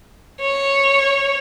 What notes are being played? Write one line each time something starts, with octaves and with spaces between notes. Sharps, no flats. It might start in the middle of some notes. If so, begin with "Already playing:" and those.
C#5